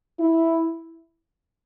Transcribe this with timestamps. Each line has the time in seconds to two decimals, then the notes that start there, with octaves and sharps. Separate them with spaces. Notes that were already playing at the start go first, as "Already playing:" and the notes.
0.20 E4